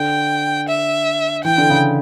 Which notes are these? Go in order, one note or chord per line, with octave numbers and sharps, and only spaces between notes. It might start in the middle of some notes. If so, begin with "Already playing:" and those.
Already playing: D3 G5
E5
E3 G5
D3
C#3